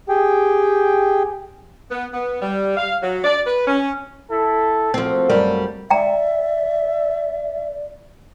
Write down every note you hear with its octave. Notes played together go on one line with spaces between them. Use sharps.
G4 G#4 G5
B3
B3
G3
F5
F#3
D5
B4
C#4
E4 A4
F3 A#3 C4 F#4 A4
F#2 G3 A#4
D5 E5 G5 A#5